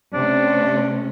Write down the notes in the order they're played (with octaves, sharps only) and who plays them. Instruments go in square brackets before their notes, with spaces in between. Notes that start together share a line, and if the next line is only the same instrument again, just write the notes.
[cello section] C3 A3 C#4 [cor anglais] D4